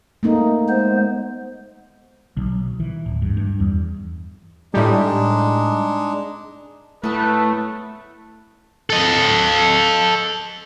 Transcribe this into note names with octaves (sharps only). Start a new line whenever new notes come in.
A3 A#3 D#4
G#3 B3 C5
B1
E3
D1
G2
G2
E2
A2 G3 G#3 D4 D#4
A2 A3 B3 B4 A5
A4 D#5